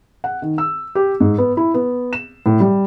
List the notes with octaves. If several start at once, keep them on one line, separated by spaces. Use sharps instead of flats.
F#5
D#3
E6
G4
G#2
B3
E4
B3
E7
A2
G3